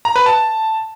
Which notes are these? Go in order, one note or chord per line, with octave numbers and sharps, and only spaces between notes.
A#5
B4
A5